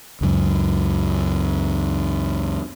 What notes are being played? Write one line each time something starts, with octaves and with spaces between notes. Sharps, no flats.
C#2 F#2